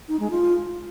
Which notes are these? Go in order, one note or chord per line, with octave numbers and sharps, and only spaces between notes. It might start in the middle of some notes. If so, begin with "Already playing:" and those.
D#4
G#3
F4